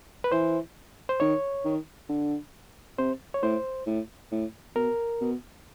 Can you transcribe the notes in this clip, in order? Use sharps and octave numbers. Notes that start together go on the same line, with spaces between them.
B4
E3 C5
C5
D#3 C#5
D#3
D3
C3 C5
C#5
A2 C5
A2
A2
B2 A#4
B2